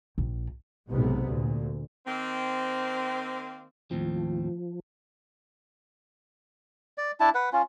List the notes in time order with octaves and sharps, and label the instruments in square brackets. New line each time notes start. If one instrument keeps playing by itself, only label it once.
[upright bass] A#1
[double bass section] B1 G#2 C3 B3
D2 A#2
[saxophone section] D#3 A#3 C4
[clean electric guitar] D#2 A2 C4 [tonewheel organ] F3
[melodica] D5
D4 E4 A5
B4 F#5
C#4 F4